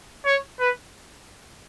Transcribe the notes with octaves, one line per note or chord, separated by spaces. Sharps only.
C#5
B4